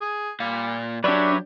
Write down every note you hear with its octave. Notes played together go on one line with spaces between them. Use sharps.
G#4
A#2 G3 F5
F#3 D4 G4 B4 C#5 D5 E5